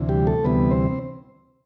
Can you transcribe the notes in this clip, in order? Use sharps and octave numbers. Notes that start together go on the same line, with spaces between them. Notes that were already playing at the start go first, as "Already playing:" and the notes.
Already playing: D2 C3 E3
G3 G4
A3 A4
D2 C3 E3 G3 B3 B4
C4 C5